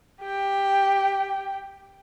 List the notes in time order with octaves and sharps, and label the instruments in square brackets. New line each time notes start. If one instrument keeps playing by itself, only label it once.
[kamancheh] G4 G5